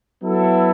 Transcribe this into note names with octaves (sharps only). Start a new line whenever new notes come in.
F#3 B3 E4 A4